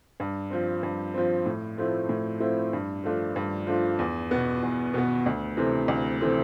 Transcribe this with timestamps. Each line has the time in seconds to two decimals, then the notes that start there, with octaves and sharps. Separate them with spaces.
0.20 G2
0.50 F3 C4
0.83 G2
1.14 F3 C4
1.46 A2
1.78 F3 A3 C4 E4
2.09 A2
2.40 F3 A3 C4 E4
2.73 G2
3.04 F3 A3 D4 F4
3.36 G2
3.67 F3 A3 D4 F4
3.99 E2
4.31 B2 B3
4.63 E2
4.94 B2 B3
5.26 D2
5.57 C3 E3 A3 C4
5.88 D2
6.21 C3 E3 A3 C4